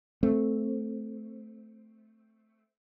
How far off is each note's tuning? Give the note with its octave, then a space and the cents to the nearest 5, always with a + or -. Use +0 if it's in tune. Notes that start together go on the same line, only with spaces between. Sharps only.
A3 +0 C4 +0